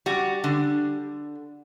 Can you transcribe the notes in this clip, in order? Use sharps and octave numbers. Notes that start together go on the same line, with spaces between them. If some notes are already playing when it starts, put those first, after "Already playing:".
G3 F#4
D3